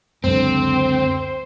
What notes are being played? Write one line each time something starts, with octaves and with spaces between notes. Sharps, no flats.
C#2 F#2 D3 C4 C5